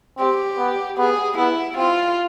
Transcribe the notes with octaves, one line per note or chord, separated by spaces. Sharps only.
C4 G4
B3
B3 G#4
B3 E4
C4 F4